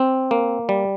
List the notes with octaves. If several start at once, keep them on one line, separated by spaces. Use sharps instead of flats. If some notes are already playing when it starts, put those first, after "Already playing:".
Already playing: C4
A#3
G3